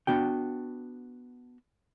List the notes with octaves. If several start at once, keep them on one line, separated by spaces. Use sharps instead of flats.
B3 D4 F#4 G5